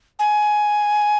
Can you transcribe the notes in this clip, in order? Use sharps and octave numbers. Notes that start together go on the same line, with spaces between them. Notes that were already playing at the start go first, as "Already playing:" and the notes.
G#5